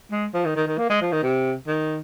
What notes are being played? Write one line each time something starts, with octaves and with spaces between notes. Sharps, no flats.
G#3
F3
D#3
D#3
D#3
A#3
G#3
F3
D#3
C3
D#3